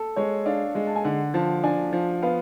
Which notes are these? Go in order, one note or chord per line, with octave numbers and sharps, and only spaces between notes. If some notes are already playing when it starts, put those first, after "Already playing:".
Already playing: A4
G#3 C#5
D4 F5
G#3
A5
G#5
D3 F#5
F3 A5
D4 G#5
F3
B3 F5